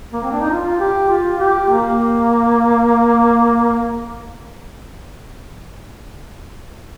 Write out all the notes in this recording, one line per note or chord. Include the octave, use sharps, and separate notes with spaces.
A#3
C4
D4
D#4
F4
G4
F4
G4
A#3